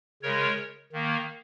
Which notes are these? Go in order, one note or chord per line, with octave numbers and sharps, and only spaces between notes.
C#3 G#3 A#4 C#5
D#3 A#3